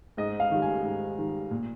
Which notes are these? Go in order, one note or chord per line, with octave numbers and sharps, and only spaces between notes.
G#2 D#5
F5
D#3 G3
G#5
G#2
D#3 G3
A#2